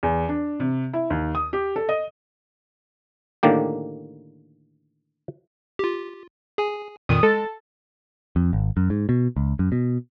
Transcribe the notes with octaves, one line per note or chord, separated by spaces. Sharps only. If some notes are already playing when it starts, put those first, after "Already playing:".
E2
D4
C3
E4
D#2
D#6
G4
A4
D#5
A2 D3 D#3 A#3 G4
F4 G4
G#4 G#5
F2 A#2 D#3 D#6
G#3 A4 A5
F2
G#1
F#2
G#2
B2
C#2
F#2
B2